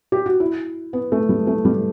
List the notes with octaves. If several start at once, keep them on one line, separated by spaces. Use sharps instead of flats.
G4
F#4
E4
B3
A3
G3
A3
G3